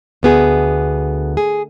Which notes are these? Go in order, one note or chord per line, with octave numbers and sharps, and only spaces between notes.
D2 B3 G#4
G#4